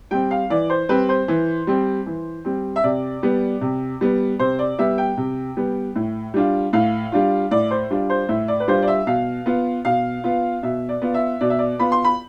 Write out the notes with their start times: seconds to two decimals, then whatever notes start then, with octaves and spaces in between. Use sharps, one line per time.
0.11 G3 C4 G5
0.31 F5
0.50 E3 D5
0.70 C5
0.89 G3 C4 B4
1.09 C5
1.28 E3
1.67 G3 C4
2.06 E3
2.45 G3 C4
2.76 E5
2.84 C3 D5
3.23 G3 B3
3.61 C3
4.01 G3 B3
4.39 C3 C5
4.59 D5
4.78 G3 B3 E5
4.98 G5
5.17 C3
5.57 G3 B3
5.96 A2
6.34 G3 D4 F4
6.73 A2 F5
7.12 G3 D4 F4
7.51 A2 D5
7.71 C5
7.90 G3 D4 F4
8.10 C5
8.29 A2 E5
8.48 D5
8.60 B4
8.68 G3 D4 F4 C5
8.83 D5
8.88 E5
9.07 B2 F5
9.46 B3 F4
9.85 B2 F5
10.24 B3 F4
10.63 B2 E5
10.89 D5
11.02 B3 F4
11.14 E5
11.41 B2 D5
11.50 E5
11.59 D5
11.79 B3 F4 B5
11.92 C6
12.04 B5